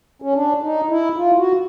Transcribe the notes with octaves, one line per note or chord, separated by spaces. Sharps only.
C#4
D4
D#4
E4
F4
F#4